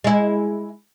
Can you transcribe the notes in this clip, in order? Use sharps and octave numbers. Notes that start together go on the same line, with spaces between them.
G#3 E4